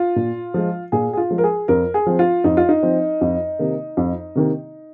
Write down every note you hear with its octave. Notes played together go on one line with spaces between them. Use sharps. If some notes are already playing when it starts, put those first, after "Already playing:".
Already playing: F4
A#2
F3 G#3
A#2 G#4
G#4
F4
F3 G#3
A#4
G#4
F2 A#4
G#4
F3 C4
F4
F2 D#4
F4
D#4
F3 C4
F2
C3 D#3 A#3
F2
C3 D#3 A#3